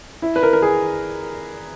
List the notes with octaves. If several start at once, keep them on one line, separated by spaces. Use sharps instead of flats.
E4
B4
A#4
A#4
G#4